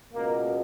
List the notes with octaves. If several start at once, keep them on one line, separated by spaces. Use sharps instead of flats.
C#2 B2 A#3